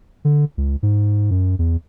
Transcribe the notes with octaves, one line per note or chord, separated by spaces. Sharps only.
D3
C#2
G#2
F#2
E2